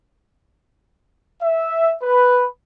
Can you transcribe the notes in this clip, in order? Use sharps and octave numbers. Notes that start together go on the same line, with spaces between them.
E5
B4